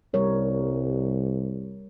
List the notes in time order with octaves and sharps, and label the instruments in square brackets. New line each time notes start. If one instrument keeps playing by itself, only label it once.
[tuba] C2 [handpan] G3 A#4 C#5